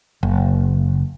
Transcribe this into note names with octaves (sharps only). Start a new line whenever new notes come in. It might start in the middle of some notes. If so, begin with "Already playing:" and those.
F#1